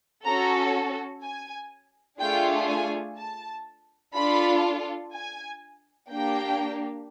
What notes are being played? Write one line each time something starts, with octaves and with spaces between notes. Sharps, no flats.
C#4 F#4 A4 A#5
G#5
A3 D4 F4 G#4 G5
G#5
A5
D4 F4 A4 B5
G#5
A#3 D4 G4 G5